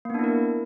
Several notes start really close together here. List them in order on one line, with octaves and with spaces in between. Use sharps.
A#3 B3 D4 E4 A#4